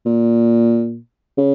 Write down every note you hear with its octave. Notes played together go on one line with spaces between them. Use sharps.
A#2
C#3